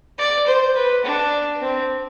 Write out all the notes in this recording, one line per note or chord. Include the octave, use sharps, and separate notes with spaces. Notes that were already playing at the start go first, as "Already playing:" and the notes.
D5
C5
B4
D4
C4